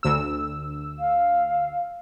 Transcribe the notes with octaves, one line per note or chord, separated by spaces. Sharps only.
D2 E6
F5